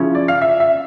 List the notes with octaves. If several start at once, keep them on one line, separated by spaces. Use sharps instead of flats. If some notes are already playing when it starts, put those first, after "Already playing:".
Already playing: C#3 F3 C#4 E4
D5
F5
E5
E5